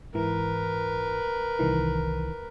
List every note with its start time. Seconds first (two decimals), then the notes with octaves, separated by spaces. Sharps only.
0.14 G#2 E3 A#4 B4
1.59 C2 D#3 E3